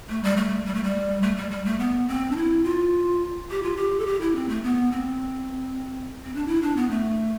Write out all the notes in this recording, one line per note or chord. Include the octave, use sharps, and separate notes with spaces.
A3
G3
A3
G3
A3
G3
A3
G3
G3
A3
B3
C4
D4
E4
F4
G4
F4
G4
A4
G4
E4
C4
A3
B3
C4
C4
D4
E4
D4
B3
A3